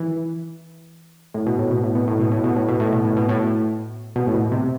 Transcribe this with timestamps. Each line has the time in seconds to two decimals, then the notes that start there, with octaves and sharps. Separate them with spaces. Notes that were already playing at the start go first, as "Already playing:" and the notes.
Already playing: E3
1.34 A2
1.46 B2
1.59 A2
1.71 B2
1.83 A2
1.95 B2
2.08 A2
2.19 B2
2.32 A2
2.44 B2
2.56 A2
2.68 B2
2.80 A2
2.92 B2
3.05 A2
3.17 B2
3.29 A2
4.16 B2
4.27 A2
4.34 B2
4.51 C3